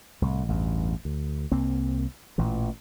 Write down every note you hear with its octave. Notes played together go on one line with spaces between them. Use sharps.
C2 A2
A1 E2 G2
D2
C2 A#3 C4
A1 A#2 E3